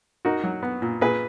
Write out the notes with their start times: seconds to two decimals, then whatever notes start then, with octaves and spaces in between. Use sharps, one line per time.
0.25 D#4 F#4 A#4
0.44 F#3
0.63 B3
0.82 A#2
1.01 A#2 G#4 B4